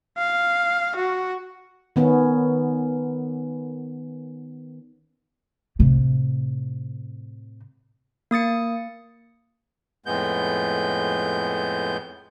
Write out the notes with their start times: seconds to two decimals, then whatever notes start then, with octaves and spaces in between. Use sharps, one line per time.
0.18 F5
0.96 F#4
1.96 D#3 B3 C#4
5.79 A2 C3
8.31 A#3 D#6 A6 C#7
10.06 F2 A2 G#3 B3 G6